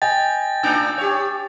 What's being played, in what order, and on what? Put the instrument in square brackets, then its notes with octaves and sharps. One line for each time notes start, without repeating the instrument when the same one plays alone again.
[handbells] D#5 [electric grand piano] G5 G#5 [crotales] A6
[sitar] A2 D4 D#4 [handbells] E6 G6 D7
[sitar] G4 C#5